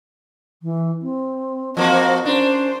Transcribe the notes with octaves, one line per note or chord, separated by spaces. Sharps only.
E3
C4
F3 A#3 C4 F#4 D#5
C#4 D4 C5